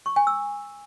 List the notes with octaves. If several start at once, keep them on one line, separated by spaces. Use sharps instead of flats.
C#6
G#5
E6